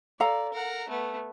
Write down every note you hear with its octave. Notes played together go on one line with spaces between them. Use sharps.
A4 D5 F5 A#5
A#4 F#5
A3 B3